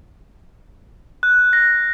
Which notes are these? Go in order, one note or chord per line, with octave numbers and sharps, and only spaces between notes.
F#6
A#6